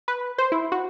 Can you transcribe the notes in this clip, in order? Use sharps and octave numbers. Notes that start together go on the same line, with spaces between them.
B4
C5
E4
F#4